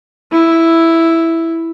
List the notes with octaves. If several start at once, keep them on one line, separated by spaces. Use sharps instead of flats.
E4